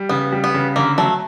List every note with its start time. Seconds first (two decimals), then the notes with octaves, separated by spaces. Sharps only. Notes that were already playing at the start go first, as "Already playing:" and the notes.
Already playing: G3
0.09 C#3 B3
0.32 G3
0.44 B3
0.54 C#3
0.76 D3 A#3
0.98 F#3 A3